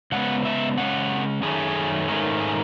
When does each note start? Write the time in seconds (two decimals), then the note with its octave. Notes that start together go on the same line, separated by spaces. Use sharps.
0.12 C#3 G#3 B3 F#5
0.45 E5
0.77 C#3 G#3 C#4 F#5
1.43 F#2 D#3 A3 C#4 G#4
2.08 G#2 D#3 A3 C#4 G#4
2.40 G#4